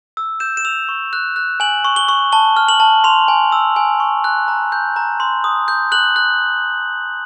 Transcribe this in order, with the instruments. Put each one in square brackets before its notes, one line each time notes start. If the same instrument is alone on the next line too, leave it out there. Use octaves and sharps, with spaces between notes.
[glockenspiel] E6
G6 E7
E7
E6 F7
C#6
F#6
F#6
G#5 F#7
C#6
G7
C#6
A5 G7
F6
F#7
A5
C6 F7
G#5
E6
G#5
C#6
F#6
A#5
G6
A#5
C6
D#6
G6
F#6 F#7
F#6